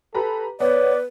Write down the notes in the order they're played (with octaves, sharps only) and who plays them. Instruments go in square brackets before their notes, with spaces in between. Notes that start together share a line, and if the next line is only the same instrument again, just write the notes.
[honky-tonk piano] G4 B4 A#5 [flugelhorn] A4
[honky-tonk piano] B3 [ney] B4 [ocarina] C#5 [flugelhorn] D5